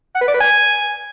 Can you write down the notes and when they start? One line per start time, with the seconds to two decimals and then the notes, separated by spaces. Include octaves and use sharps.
0.15 F#5
0.21 B4
0.28 D5
0.34 B4
0.40 G#5